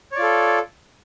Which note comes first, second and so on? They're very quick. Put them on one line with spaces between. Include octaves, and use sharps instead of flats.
C#5 D5 F4 A4